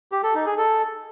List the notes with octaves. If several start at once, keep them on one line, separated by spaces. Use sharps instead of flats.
G4
A4
D#4
G#4
A4